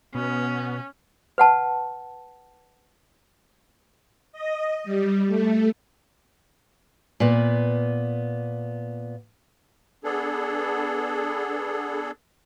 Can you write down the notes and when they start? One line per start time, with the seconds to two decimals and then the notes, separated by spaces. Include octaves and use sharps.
0.15 B2 B3 C#4
1.38 B4 F#5 A5
4.32 D#5
4.84 G3
5.27 A3
7.20 A#2 B3
10.04 B3 D4 G#4 A4